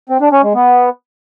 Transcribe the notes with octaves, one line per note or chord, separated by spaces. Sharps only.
C4
D4
C#4
G#3
B3